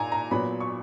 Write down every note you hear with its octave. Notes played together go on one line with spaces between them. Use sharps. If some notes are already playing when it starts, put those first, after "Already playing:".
Already playing: A#2 G#5 A#5
A#5
A#2 F#3 B3 B5
C#6